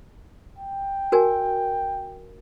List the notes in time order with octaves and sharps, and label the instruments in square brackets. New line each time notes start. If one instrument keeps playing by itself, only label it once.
[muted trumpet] G5
[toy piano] F#4 A#4 G#5